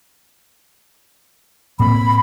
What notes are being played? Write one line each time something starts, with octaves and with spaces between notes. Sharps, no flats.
A2 A#3 C4 B5